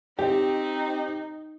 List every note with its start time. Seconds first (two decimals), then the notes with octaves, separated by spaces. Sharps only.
0.19 C4 D#4 G4